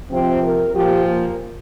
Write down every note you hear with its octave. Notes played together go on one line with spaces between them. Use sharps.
C3 F3 C4
A#4
A#2 F3 G4
A#3